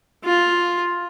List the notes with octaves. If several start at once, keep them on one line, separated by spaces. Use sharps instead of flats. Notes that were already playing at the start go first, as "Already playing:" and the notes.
F4